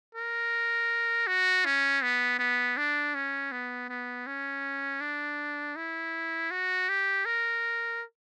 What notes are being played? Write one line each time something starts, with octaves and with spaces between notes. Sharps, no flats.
A#4
F#4
C#4
B3
B3
D4
C#4
B3
B3
C#4
D4
E4
F#4
G4
A#4